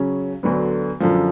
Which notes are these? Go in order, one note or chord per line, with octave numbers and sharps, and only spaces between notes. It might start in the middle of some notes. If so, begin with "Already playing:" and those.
Already playing: C#3 F#3 C#4
D2 D3 F#3 B3
F#2 D3 F3